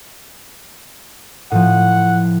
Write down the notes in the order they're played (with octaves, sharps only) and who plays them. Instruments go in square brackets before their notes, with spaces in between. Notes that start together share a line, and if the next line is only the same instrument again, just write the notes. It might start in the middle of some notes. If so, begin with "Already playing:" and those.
[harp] A2 F3 [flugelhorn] F#5